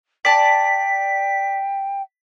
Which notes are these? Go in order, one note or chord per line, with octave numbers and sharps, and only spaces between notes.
D5 G5 A5 B6